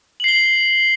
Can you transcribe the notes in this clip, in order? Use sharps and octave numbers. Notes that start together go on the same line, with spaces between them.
C7 F#7 G7